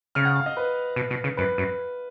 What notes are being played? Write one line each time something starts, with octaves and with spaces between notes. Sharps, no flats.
C#3 F6
F#5
F5
D#5
B4
B2
B2
C#3
F#2 B4
F#2